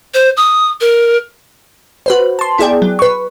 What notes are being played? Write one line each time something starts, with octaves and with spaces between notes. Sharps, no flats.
C5
D#6
A#4
F#4 B4 C5
A5 C6
B3 E4 G#4 D5 G5
F#3
B4 C#6